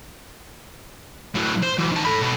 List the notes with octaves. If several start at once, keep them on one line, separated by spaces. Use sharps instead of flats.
A2 F#3
C5
E3 F#3
D#3 A5
A4 B5
B2 A4